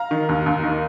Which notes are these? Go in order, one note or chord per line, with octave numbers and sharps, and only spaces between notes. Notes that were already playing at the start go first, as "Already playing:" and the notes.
Already playing: F5 A#5
D#3
D#2
D#2
D#3